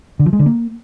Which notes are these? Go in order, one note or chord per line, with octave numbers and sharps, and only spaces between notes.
D3
F3
G#3
D3
A#3